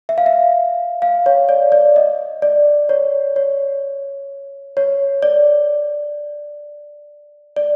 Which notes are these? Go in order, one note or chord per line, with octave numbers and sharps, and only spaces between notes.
E5
F5
E5
F5
C#5
D5
D5
D#5
D5
C#5
C#5
C#5
D5
D5